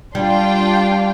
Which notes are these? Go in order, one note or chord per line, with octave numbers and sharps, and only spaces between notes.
G3 D4 F4 G5